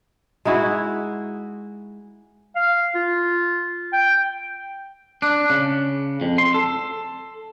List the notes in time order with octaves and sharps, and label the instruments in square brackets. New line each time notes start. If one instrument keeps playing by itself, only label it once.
[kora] G#3 D#4 E4 F#4
[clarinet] F5
F4
G5
[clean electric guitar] D4
C#3
F2
C6
A4